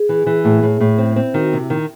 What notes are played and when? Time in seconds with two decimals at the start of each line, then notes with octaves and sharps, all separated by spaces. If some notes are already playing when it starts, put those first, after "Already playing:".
Already playing: G#4
0.09 E3
0.26 E3
0.45 A2
0.63 A2
0.80 A2
0.98 C4
1.16 C4
1.34 D#3 F#4
1.53 C3
1.58 E4
1.70 D#3